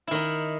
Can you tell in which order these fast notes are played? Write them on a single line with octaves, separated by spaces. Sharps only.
E4 D#3 D#4